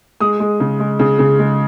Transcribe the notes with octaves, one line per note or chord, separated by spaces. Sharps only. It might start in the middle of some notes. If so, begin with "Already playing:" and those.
G#3 D#6
G#3
C#3
G#3
C#3
C#3
G#3